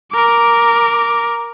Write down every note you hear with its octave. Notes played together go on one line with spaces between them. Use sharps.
A#4 D6